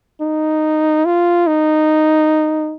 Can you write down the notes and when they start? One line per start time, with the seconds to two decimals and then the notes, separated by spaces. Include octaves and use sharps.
0.21 D#4
1.05 F4
1.47 D#4